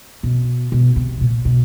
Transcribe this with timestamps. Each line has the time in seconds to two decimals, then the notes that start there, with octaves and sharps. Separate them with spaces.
0.23 B2
0.72 B2
0.96 C3
1.21 A#2
1.45 B2